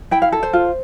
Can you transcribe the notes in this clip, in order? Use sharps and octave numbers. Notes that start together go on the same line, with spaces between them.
E4 G5
F5
A4
C5
F4